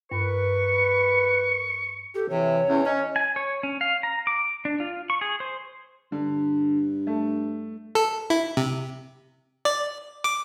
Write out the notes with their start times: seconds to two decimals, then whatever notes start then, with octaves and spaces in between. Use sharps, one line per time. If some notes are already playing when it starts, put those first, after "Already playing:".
0.11 G2 A#4 B4 C#6
2.14 G4 A4
2.30 C3 E3 C#5
2.68 E2 C#4
2.86 C#4 D#5
3.16 G#5
3.36 C#5
3.63 C#4
3.81 F5
4.03 A#5
4.27 D6
4.65 D4
4.80 F4
5.10 C#6
5.21 G#4
5.40 C5
6.12 G2 D3
7.07 A3
7.95 A4
8.30 E4
8.57 C3
9.65 D5
10.24 D6